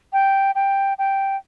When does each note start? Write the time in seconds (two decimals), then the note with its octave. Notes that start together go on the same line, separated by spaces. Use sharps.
0.13 G5
0.55 G5
0.99 G5